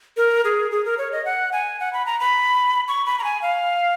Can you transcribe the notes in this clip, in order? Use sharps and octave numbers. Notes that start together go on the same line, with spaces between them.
A#4
G#4
G#4
A#4
C#5
D#5
F#5
G#5
F#5
B5
A#5
B5
C#6
B5
A#5
G#5
F5